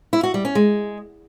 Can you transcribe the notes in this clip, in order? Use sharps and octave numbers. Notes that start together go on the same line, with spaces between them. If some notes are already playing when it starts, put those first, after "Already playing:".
E4
F#4
G3
C#4
G#3